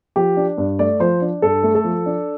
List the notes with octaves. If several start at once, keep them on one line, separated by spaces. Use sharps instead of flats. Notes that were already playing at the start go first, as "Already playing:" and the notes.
F3 G4
D4
G2
A3 D5
F3 C5
D4
G2 A4
A3
A4
F3
D4